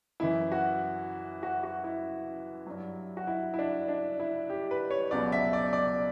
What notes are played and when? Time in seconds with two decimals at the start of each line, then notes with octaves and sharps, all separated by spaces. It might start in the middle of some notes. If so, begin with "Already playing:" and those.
0.20 F#2 E3 E4
0.52 F#4
1.43 F#4
1.63 F#4
1.84 E4
2.66 G2 F#3
3.17 F#4
3.27 E4
3.54 E4
3.59 D4
3.88 D4
4.20 E4
4.50 G4
4.71 B4
4.90 C#5
5.11 C#2 B2 F#3 D5
5.32 E5
5.53 D5
5.73 D5